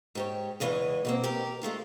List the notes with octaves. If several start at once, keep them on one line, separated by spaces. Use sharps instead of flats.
G#2 G4 C#5
E2 C#3 E3 G#3 D#5
B2 A#3 C4
G4 A#4
G#3 A3 F4 A#4